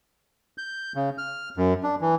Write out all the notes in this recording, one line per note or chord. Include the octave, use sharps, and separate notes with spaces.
G6
C#3
F6
F#2
D4
E3